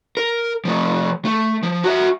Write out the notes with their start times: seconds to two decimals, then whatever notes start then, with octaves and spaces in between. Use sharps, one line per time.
0.17 A#4
0.65 F3 A3
1.25 A3
1.63 F3
1.84 F#4 E5